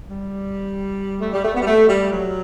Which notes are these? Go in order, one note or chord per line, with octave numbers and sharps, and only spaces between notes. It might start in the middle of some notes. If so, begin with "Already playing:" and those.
G3
A3
G3
A3
B3
G3
A3
G3
F#3